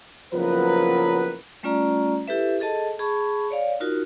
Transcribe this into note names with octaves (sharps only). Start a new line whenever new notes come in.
F#1 F3 F#3 B3 A#4 B4
G3 A3 C#4 F4 D5 A#5
E4 G4 A4 B4 E5
G#4 A4 D#5 A5
G#4 A5 B5 C#6
C#5 D5 F5
D#4 F4 F#4 A#4